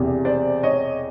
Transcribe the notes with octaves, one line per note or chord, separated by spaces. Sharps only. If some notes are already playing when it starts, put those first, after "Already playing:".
Already playing: E1 E2 C3
C5 D5
C#5 D#5